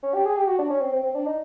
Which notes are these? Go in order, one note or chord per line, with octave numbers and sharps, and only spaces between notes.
C#4
G4
G#4
G4
F#4
D4
C#4
C4
C4
C4
D4
D#4